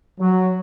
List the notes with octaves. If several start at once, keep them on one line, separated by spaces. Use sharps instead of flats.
F#3